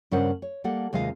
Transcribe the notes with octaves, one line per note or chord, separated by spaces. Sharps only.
G2 C#3 C#4 A#4 C5 F#5
C#5
G3 A#3 A4 F#5
D#2 C3 G#3 F4 D#5 F5